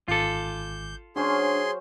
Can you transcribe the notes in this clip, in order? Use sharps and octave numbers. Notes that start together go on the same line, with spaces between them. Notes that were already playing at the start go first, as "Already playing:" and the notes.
G#1 F4 A4 G#5 D6 G6
F#3 C#4 D4 G#4 C5 C6